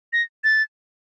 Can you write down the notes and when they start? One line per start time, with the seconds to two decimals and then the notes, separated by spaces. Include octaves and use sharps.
0.13 A#6
0.44 A6